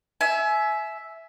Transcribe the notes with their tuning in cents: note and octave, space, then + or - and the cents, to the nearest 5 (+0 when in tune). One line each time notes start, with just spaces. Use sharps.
E5 +0 G#5 +30